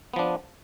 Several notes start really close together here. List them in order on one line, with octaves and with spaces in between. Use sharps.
B3 F3 D4